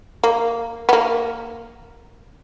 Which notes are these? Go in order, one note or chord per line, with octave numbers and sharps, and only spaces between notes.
A#3
B3
A#3